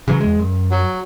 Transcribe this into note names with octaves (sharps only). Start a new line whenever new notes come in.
C#3 E3 F#3
E2 G#3
F#2
F#3